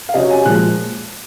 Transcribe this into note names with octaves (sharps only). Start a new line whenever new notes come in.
F5
C3 F#3 C#4 D#5
G#5
A#2 F3 G#3 F#6